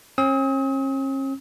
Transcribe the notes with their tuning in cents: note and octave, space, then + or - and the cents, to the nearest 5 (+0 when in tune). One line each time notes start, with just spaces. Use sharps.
C#4 -45 D#6 +45